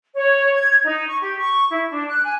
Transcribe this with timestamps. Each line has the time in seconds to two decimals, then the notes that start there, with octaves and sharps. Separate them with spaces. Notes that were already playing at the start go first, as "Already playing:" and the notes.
0.14 C#5
0.54 G#6
0.84 D#4
1.08 C#6
1.21 G4
1.38 C#6
1.70 E4
1.91 D4
2.07 F#6
2.24 G#5